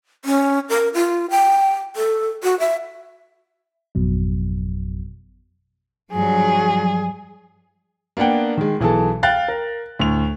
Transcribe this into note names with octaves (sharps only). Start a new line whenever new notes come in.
C#4
A#4
F4
G5
A4
F#4
E5
G#1 F2 B2 F#3
G2 F3 F#3 G#4
A#3 B3 D4 F#5 G5
D#3 G#3
B1 E3 G#4 A4 A5
F5 G5 F#6 A6
A#4
D2 A2 F7